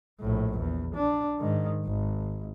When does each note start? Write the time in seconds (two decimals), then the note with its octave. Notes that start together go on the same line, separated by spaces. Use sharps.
0.20 A#1 A2
0.58 E2
0.95 D4
1.39 G#2 D#3
1.85 G#1